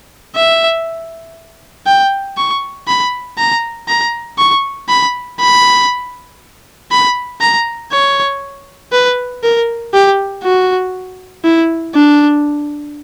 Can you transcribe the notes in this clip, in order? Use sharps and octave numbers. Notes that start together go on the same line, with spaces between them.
E5
G5
C#6
B5
A#5
A#5
C#6
B5
B5
B5
A#5
C#5
B4
A#4
G4
F#4
E4
D4